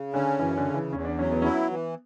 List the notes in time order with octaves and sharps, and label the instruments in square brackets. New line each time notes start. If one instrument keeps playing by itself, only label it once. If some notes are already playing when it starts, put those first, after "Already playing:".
Already playing: [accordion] C#3
[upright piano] D3 [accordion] C#4
[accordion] F#2 [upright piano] E3
[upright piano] D3
[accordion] C#3
[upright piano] E3
[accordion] E2 [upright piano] C#4
[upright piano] D4
[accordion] F#3 [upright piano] C#4
[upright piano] B3
[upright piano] C#4 [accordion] E4
[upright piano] B3
[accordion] E3